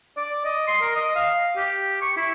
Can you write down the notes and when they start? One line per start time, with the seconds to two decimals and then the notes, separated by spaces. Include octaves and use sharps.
0.17 D5
0.45 D#5
0.68 C6
0.81 A#4
0.95 D#5
1.16 F5
1.56 G4
2.01 C#6
2.17 E4